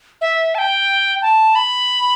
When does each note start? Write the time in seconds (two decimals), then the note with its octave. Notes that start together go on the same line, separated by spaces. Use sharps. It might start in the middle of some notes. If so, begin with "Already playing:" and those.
0.21 E5
0.55 A5
0.58 G5
1.22 A5
1.55 B5